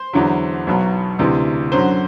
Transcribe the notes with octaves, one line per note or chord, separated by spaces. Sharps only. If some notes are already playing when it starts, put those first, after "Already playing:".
Already playing: C5
E2 D3 F#3
B1 B2 F#3
D2 C3 E3
F#2 D3 F#3 C5